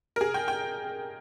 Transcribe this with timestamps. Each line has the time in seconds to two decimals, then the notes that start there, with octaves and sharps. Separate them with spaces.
0.16 A#4
0.21 G#4
0.34 G5
0.48 G5